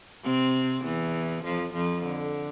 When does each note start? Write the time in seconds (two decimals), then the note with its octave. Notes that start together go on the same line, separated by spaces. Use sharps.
0.24 C3 C4
0.85 E2 E3
1.44 F2 F3
1.74 F2 F3
2.05 D3